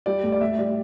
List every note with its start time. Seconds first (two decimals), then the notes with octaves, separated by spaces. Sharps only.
0.06 G3 D5
0.23 A2
0.32 D5
0.41 A2 E5
0.58 G3 D5